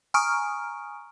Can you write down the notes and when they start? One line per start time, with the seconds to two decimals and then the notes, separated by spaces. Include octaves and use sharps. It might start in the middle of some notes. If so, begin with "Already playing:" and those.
0.14 G#5 A#5 C#6 D#6 F6 D7